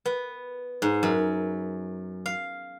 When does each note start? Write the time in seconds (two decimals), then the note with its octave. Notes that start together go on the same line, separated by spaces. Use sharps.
0.06 B3
0.82 G#2
1.03 F#2
2.26 F5